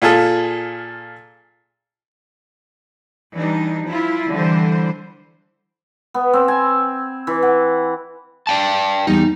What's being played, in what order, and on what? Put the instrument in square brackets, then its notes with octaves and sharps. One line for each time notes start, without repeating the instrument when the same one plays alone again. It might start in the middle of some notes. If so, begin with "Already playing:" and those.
[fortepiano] A#2 F4 G#4 A4
[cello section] E3 G3 D4 D#4
F3 E4 F4
D3 E3 G3 C5
[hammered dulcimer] B3
C4
G#5
E3
F#5
[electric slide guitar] D5 G5 A5
[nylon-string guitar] E2 G3 [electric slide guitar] D#4